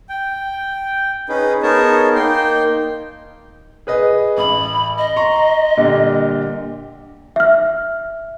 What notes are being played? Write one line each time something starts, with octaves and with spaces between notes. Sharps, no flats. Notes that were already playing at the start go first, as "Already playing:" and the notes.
G5
C#4 D#4 G#4 B4
B3 D#4 G#4 A#4 C#5 A5
A#3 D#4 G5 C6
G#4 B4 D#5
A1 B5
D#5
A#5 C6 C#6
A#2 D3 G3
E5 F6